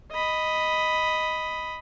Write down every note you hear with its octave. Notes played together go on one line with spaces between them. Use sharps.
D#5 B5